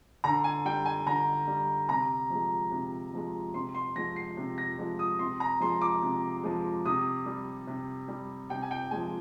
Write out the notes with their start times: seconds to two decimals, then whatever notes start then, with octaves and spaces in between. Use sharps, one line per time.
0.24 D3 A#5
0.44 G#5
0.65 G3 G5
0.85 G#5
1.06 D3 A#5
1.47 G3
1.89 C3 A#5
2.30 F3 G#3
2.71 C3
3.13 F3 G#3
3.54 C3 C6
3.75 C6
3.95 F3 G#3 A#6
4.16 C7
4.37 C3
4.58 A#6
4.79 F3 G#3
4.99 D#6
5.19 C3 C6
5.40 A#5
5.60 F3 G#3 C6
5.81 D6
6.02 C3
6.43 F3 G#3
6.85 C3 D#6
7.26 G3
7.67 C3
8.08 G3
8.50 C3 G5
8.62 G#5
8.71 G5
8.91 F3 G#3 G#5